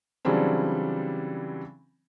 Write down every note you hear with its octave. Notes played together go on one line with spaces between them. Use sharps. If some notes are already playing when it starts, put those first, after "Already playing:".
C#3 E3 F#3 G3 C4 D4